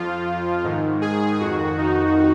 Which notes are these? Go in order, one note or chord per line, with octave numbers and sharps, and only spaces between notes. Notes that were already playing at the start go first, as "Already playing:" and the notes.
Already playing: F2 F3 F4
G#2 D#3
G#4
F2 D#3 F#4
D#4